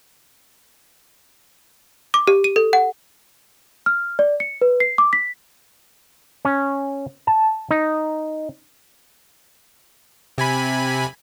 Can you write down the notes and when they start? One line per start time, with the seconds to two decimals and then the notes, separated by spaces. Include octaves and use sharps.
2.14 D6
2.27 G4
2.44 D#7
2.56 A4
2.73 F#5
3.86 F6
4.19 D5
4.40 C#7
4.61 B4
4.80 C7
4.98 D6
5.13 B6
6.45 C#4
7.27 A5
7.71 D#4
10.38 C3 G#5 B5